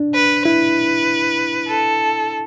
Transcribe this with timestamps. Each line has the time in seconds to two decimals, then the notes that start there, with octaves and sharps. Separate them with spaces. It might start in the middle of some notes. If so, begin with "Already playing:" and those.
Already playing: D4
0.14 B4
0.45 E4 B4
1.68 A4